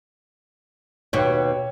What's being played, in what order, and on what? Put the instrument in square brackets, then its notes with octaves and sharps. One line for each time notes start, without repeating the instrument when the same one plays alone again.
[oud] D#2 B2 [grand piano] C#5 G5